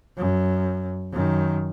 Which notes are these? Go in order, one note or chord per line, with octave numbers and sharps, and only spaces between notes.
F#2
F#2 D#3